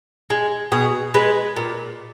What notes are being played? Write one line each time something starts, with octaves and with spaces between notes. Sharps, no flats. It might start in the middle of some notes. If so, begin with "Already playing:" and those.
G#3
B2 G#4
G#3 B4
A#2